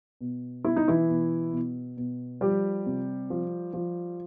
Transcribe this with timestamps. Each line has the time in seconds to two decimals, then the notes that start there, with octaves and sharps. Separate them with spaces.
0.21 B2
0.65 B2 E4
0.76 D#4
0.88 E3 E4
1.09 B2
1.53 B2
1.97 B2
2.41 F3 G3 G4
2.86 C3
3.30 F3
3.73 F3